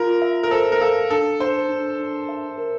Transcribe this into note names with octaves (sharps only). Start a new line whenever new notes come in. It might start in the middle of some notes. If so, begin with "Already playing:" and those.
Already playing: F4 A#4
E5
A#4
A4 C5
A#4
A4 F5
D4 A4
D4 C5
D4
D4
E5
A#4